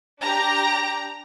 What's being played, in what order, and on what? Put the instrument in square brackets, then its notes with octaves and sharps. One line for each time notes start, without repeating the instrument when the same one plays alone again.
[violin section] D4 G4 A#5